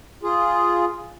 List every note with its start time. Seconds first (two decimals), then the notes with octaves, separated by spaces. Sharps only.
0.23 F4 G#4